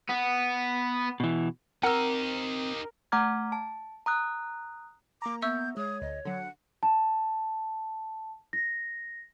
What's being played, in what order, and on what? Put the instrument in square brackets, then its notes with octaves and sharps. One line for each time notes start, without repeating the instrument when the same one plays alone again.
[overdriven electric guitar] B3
[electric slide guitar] B2 E3
[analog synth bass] C4 [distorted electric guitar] D#4 G4 [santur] A#4 [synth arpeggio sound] F#5 E6
[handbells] A3 F#5 A#5 D6 F6 G#6
A5
A#5 D#6 F#6
[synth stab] A#3 A#5 [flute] D6
[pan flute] B3 [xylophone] E5 C#6 E6 [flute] G6
[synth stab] G#3 [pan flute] C#5 [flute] D#6
[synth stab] D2 [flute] D#5
[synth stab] D3 F#3 [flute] F#5
[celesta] A5
A#6